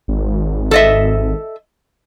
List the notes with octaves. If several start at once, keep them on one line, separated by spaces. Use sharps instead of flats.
G#1
A4 D#5 E5